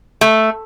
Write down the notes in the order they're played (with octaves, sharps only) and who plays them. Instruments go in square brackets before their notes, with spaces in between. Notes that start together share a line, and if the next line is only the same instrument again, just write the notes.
[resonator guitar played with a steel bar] A3